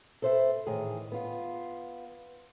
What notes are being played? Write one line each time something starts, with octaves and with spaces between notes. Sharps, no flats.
A4 B4 C5 D5 E5
A2 D#3 E3 G#4
B3 F4